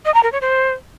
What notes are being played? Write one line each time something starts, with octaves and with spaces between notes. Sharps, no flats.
D#5
A#5
A#4
C#5
C5